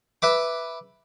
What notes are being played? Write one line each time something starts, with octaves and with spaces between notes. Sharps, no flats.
B4 E5 D6